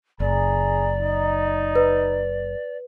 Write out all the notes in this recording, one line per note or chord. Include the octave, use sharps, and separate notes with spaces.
F#1 G#4 D5 A#5
D#4
B4